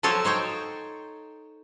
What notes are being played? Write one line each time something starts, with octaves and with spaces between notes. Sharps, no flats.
F3 F#3 A4 C5 C#5 A5
D#4 C5 C#5 G5